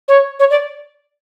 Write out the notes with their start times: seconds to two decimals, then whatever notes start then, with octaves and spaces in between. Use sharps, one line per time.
0.08 C#5
0.39 C#5
0.50 D5